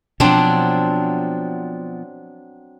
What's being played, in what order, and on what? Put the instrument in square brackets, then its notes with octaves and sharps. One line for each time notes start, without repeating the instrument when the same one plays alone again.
[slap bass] B2 F3 [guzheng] F#3 C4 D4